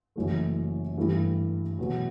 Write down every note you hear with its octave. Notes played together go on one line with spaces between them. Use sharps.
F#1 F#2 E3 A3
G2 E3 A3 E4 G4
E2 B2 F#3 A3